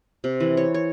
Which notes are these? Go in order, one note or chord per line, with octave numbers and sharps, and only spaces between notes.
C3
E3
C#5
C#5